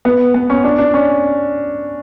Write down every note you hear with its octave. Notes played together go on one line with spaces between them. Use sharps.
B3
B3
C#4
D4
D4
C#4